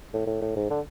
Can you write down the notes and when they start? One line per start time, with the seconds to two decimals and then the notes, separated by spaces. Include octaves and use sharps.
0.13 A2
0.27 A2
0.42 A2
0.56 G#2
0.70 D3